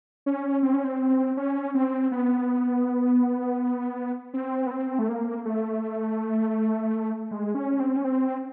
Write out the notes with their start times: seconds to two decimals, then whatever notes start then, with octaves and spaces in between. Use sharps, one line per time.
0.26 C#4
0.63 C4
0.74 C#4
0.84 C4
1.37 C#4
1.74 C4
2.12 B3
4.34 C4
4.66 B3
4.71 C4
4.99 A3
5.09 A#3
5.45 A3
7.31 G#3
7.55 C#4
7.80 C4
7.96 C#4
8.04 C4